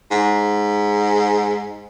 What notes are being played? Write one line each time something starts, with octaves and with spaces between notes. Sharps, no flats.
G#2